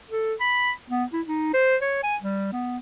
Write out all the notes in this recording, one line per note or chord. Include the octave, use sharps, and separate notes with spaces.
A4
B5
B3
E4
D#4
C5
C#5
G#5
G3
B3